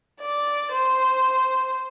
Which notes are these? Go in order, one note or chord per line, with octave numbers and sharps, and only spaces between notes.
D5
C5